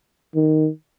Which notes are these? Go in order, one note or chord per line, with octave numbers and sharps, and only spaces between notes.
D#3